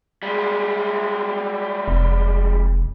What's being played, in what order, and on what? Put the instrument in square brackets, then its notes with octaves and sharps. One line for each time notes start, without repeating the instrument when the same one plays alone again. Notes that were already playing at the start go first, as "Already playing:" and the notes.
[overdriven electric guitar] G3 G#3
[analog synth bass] F1